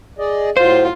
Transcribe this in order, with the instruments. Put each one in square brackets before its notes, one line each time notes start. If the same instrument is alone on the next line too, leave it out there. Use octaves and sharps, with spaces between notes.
[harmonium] G#4 D5 D#5
[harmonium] A2 F#3 [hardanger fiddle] F4 [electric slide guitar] C5